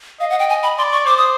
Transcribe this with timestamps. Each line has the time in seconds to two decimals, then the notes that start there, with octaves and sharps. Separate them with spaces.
0.20 D#5 F5
0.30 F#5
0.39 G5
0.49 G#5
0.63 B5
0.78 D5 C6
0.92 C#6
1.06 C5 D6
1.17 D#6